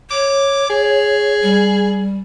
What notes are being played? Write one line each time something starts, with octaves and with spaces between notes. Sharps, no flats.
C#5 D6
G#4
G3